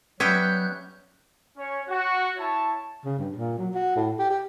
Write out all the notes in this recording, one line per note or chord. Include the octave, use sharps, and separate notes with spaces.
F#3 G3 B3 C#4 E5 G5 F#6 G6
C#4 C#5
F#4
E4 C#5 A5
C#3
G2
A#2
F#3
F#4
A2
G4
G4